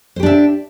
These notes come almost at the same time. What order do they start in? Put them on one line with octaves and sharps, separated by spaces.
C5 G4 D4 E5